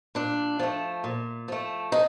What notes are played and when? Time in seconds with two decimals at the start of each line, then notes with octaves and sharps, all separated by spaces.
0.15 A#2 D4
0.59 F3 A3
1.04 A#2
1.48 F3 A3
1.92 C3 D#4